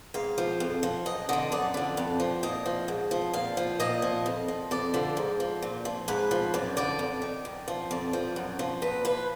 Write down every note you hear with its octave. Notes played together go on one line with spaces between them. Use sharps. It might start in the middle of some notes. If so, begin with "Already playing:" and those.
G#2 F5
F3
F2
F3
F#2 D#5
D3 F3 D#5
F#2 D5
D3 F3
F2
F3
A#2 D#5
F3
G#2
F3
A#2 F5
F3
A#2 D#5
F3
F2
F3
F2 D5
D3 F3
G#2
F3
A#2
F3
G#2 B4
F3
F#2 D5
D3 F3 D5
F2
D#3
F#2
F3
F2 D5
F3
F#2
F3
A#2 B4
F3 B4